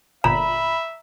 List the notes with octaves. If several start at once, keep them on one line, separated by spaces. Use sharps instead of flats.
G1 A#2 E5 A#5 B5